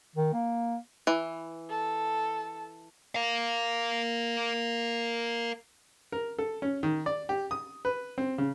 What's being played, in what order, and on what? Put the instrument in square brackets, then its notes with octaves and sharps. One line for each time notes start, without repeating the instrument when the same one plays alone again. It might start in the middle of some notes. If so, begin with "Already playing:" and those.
[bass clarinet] D#3
A#3
[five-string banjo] E3
[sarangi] A4
[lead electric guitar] A#4 F5
[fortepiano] A#4
A4
C#4
D#3
D5
G4
D#6
B4
C4
C#3